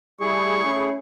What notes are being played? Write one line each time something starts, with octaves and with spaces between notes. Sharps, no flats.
G3 A3 E4 G#4 C#6
C#4